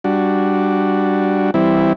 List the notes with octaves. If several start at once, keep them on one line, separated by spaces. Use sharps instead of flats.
G3 D4 F#4
E3 G3 C4 E4